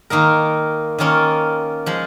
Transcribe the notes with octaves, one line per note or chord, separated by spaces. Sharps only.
D#3 A#3 D#4 A#4
D#3 A#3 C#4 F4
F3 G#3